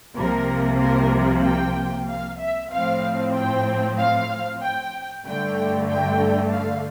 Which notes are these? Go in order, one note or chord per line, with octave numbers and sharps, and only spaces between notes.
C2 C3 F3 A#3 A#4
A#4
G5
F5
E5
A2 F3 C4 F5
G5
F5
G5
G2 D3 A3 G5
G5
F5